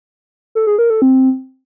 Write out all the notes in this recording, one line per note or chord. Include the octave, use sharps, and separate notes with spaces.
A4
G#4
A#4
A4
C4